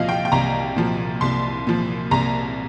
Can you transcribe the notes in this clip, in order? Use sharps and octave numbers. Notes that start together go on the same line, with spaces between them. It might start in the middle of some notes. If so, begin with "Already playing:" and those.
Already playing: C2 A#2 F3 D#5 F5
G5
G5
C2 A#5
A#2 F3
C2 C6
A#2 F3
C2 A#5